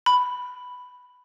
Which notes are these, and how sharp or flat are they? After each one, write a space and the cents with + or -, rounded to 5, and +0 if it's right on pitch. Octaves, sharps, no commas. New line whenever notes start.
B5 +5